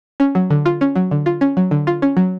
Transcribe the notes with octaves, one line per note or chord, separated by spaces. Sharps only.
C#4
F#3
D3
F4
C#4
F#3
D3
F4
C#4
F#3
D3
F4
C#4
F#3